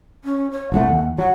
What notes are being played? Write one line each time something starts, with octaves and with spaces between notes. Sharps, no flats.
C#4
C#5
D#1 C2 A3 F#5
D#2
F#3 F#5